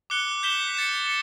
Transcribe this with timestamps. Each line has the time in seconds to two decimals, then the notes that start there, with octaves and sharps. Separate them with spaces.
0.10 D6 F#6 C#7 G7
0.43 G6 B6 E7 G7
0.74 A6 C#7 E7
1.07 C#7